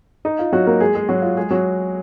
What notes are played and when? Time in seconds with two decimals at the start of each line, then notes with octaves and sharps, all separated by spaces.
0.25 D#4
0.39 F4
0.52 F#3 F#4
0.67 A#3 A#4
0.80 G#3 G#4
0.95 G#3 G#4
1.09 F#3 F#4
1.22 F4
1.37 G#3 G#4
1.50 F#3 F#4